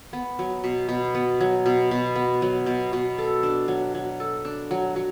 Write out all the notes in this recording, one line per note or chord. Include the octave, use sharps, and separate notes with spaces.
B3
F#3
B2
B2
B3
F#3
B2
B2
B3
F#3
B2
B2
A4
D4
F#3
F#3
A4
D4
F#3
F#3